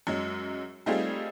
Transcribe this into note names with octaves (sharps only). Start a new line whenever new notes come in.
F#2 F#3 G#3
G3 A3 C4 D#4 F4 G#4